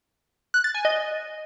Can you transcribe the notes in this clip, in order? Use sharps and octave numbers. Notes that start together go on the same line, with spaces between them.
F#6
A6
G#5
D#5